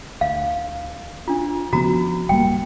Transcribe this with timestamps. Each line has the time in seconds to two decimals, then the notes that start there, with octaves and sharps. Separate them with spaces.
0.21 D2 F5
1.28 D4 F4
1.73 C#3 F3 B3 F#4 A#5
2.29 D1 G3 A#3 G5